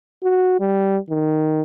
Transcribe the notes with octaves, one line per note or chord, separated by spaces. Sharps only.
F#4
G3
D#3